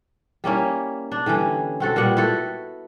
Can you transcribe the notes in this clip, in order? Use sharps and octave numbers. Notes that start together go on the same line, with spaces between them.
G3 A#3 C#4 E4
D4
D3 E3 G3 C#4
C4 F#4 A4
A#2 G3 B3 F#5
E4 F#4 A4 F#5